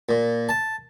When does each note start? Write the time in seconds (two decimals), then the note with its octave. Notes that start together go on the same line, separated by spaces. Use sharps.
0.09 A#2
0.49 A5